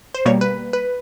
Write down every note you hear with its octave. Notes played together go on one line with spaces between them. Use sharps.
C5
B2 G3 A#3 C#5
B4
B4